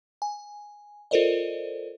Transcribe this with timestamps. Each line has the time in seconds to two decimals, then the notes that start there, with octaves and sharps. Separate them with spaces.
0.22 G#5
1.11 F4 A4 A#4 C5 D5 D#5